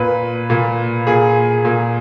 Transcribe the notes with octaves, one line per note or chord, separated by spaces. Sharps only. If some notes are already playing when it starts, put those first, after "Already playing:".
Already playing: A#2 B4
A#2
A#2 G#4
A#2